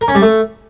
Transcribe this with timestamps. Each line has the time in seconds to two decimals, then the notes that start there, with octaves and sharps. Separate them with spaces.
0.01 A#4
0.08 C#4
0.15 G3
0.22 A3